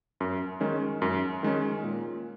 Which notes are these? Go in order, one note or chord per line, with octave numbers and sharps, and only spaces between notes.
F#2
D#3 G#3 C#4
F#2
D#3 G#3 C#4
A#2